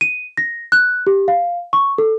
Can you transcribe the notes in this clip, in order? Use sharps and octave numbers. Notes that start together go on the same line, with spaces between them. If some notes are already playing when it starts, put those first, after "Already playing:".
D#7
A#6
F#6
G4
F5
C#6
A4